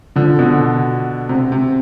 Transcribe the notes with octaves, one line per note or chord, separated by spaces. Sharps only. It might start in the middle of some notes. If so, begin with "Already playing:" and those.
D3 F3
B2 D3
C3
C3